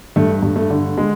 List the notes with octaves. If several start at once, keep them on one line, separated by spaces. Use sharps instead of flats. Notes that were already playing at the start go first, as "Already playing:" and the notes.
G2 A3
G2
A3
D3
G#3